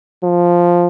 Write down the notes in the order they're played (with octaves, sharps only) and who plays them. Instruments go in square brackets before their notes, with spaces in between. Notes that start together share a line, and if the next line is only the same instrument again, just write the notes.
[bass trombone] F3